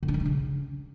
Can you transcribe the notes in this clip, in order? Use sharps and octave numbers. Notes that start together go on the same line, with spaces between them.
D3
D4
D#3
D4
C#3